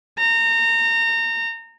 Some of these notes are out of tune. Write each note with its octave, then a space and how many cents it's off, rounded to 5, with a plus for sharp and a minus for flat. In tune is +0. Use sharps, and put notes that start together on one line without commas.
A#5 -25